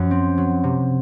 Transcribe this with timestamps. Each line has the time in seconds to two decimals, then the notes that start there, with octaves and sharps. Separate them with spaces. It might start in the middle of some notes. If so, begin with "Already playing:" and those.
Already playing: F#2 F3
0.11 C4
0.38 F#3
0.64 C3